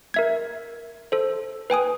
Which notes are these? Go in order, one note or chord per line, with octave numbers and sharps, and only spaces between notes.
A#4 E5 G#6
A4 C5
B4 G5 G#5 D#6